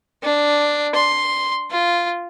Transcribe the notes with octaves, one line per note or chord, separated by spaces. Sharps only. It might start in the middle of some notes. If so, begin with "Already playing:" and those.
D4
C6
F4